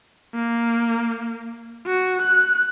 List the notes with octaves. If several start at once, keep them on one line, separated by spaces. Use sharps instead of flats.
A#3
F#4
F#6